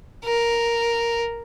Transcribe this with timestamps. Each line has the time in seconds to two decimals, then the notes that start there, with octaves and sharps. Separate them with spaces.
0.25 A#4